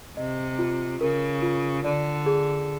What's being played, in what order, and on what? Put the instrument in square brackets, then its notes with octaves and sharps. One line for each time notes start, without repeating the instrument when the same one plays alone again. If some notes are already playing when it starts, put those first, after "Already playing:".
[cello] C3 [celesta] D#5
[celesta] F4
[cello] C#3 [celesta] A#4
[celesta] F4
[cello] D3 [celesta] D5
[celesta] G#4